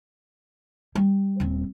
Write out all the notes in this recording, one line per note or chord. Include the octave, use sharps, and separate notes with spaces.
G3
D#1 C4